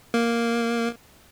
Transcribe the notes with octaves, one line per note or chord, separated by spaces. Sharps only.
A#3